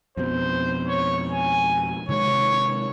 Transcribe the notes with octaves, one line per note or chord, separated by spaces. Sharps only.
F2 B2 C5
C#5
G#5
C3 D#3 G#3 C#5